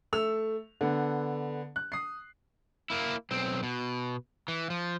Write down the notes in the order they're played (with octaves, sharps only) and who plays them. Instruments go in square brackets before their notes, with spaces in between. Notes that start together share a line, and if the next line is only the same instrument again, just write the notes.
[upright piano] A3 E6 F7
D3 B3
F#6
D#6 C7
[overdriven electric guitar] A#3 E4
B1 C4
B2
E3
F3